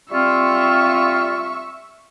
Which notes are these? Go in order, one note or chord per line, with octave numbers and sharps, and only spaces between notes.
G3 C4 F4 E5 C#6